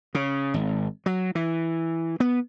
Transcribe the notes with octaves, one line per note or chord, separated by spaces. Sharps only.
C#3
G#1
F#3
E3
B3